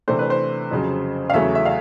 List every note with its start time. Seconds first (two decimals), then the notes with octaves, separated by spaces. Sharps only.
0.08 C3 E3 A3 D4 C5
0.19 B4
0.30 C5
0.71 F2 C#3 F#3
1.30 F5
1.33 E2 C#3 F#3 A3 C#4 E5
1.55 E5
1.65 F5